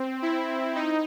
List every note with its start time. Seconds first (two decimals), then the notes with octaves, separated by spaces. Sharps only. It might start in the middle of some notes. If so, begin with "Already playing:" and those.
Already playing: C4
0.22 E4
0.75 D#4